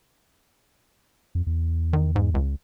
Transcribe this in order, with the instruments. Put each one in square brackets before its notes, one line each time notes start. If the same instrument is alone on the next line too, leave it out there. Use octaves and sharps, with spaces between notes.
[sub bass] F2
E2
[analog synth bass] D#3
G#2
C#2